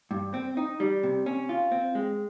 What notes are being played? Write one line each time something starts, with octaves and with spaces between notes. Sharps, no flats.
G2
C4
D#4
G3
C3
C#4
F4
C4
G#3